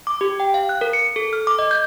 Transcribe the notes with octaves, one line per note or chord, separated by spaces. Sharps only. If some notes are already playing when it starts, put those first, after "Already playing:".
D6
G4
G5
F5
F#6
A#4
C#7
A4
F6
D6
D#5
G6